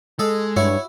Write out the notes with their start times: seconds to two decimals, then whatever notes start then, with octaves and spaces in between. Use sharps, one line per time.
0.19 G#3 A4 D#5
0.56 G2 E4 F#4 C#5